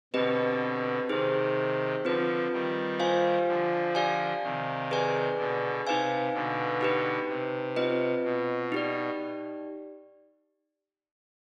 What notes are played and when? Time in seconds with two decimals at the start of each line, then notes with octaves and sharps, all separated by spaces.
0.14 B2 D3 C4 G4 B4 D#5
1.09 C3 D#3 D#4 G#4 C5
2.05 D3 F3 C4 F4 B4
2.52 D#3 G3
2.99 F4 C5 F5 G#5
3.48 D3 F3
3.95 G4 D5 F5 G#5
4.43 C3 D#3
4.91 G#4 B4 D5 G#5
5.38 B2 D3
5.86 C3 D#4 B4 F5 G#5
6.33 B2 D3
6.81 D#4 G4 B4
7.29 C3
7.76 C4 F4 B4 D#5
8.24 B2
8.72 D#4 G4 D5